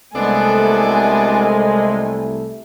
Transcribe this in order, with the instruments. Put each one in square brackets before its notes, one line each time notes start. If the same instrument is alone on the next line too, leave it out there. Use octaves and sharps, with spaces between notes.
[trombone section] C2 A3 [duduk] G#3 [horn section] B3 D4 A4 [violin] G#5